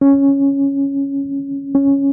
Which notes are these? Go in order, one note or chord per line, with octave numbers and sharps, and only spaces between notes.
C#4
C#4